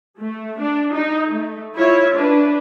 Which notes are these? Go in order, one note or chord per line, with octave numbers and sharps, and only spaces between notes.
A3
D4
D#4
A3
E4 F4 C#5 E5
D4 B4